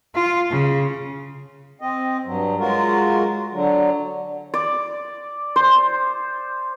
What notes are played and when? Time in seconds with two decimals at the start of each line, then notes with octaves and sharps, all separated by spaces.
0.15 F4
0.51 C#3
1.81 C4 D#5
2.26 G2 F#3
2.59 F#3 G#3 F4 F#4 A#4
3.53 D3 F#3
4.54 D5
5.56 C5